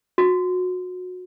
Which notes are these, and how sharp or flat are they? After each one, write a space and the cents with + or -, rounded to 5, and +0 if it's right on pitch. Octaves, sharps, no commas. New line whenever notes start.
F#4 -25